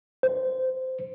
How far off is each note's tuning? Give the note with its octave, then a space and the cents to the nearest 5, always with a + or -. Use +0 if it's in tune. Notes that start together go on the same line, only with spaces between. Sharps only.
C5 -15